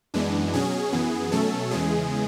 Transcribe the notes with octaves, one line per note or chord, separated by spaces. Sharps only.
F#2 E3 G#3 B3 D4
B2 F#3 C#4 G#4
F#2 E3 B3
B2 F#3 A3 C#4 A4
E2 C#3 E3 G#3 G#4